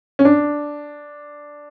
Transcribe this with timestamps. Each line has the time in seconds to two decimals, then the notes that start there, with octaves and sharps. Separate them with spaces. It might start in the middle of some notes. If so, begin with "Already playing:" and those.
0.19 C#4
0.25 D4